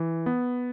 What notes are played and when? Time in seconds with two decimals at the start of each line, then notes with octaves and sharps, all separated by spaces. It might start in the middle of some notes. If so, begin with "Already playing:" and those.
Already playing: E3
0.26 B3